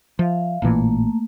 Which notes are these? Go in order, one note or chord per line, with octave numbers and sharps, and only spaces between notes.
F3 E5 F5
A1 A#2 E3 A3 A#3